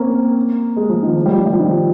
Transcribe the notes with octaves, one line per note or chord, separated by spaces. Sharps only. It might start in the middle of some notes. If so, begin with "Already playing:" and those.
Already playing: A#3 C4 C#4
G#3
F3
D#3
F3
G3
F3
G3
F3
D#3
F3